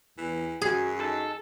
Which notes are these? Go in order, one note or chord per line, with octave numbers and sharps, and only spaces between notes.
E2 E3
F#2 F#4 G#4
D#4 A4